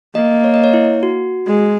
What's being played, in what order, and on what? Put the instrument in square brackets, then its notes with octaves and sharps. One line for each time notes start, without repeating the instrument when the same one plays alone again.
[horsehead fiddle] A#3 [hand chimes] D#5
[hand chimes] C#5
D#5
C#5
E4
F#4
[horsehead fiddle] G#3